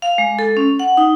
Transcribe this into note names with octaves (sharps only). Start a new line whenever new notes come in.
F5
G#3
A4
C#4
F#5
D#4